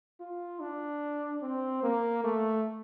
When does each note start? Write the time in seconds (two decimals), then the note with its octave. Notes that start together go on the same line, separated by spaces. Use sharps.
0.20 F4
0.60 D4
1.42 C4
1.83 A#3
2.24 A3